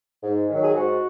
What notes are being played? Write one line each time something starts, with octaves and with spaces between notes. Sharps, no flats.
G#2
D#3 F#3
G#4
G#2 F#4